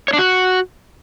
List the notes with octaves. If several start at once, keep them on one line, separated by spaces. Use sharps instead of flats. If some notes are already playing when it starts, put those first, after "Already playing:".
C#5
D4
F#4